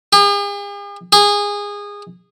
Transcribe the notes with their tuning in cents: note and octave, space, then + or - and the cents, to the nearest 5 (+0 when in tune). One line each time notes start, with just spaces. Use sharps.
G#4 -45
G#4 -20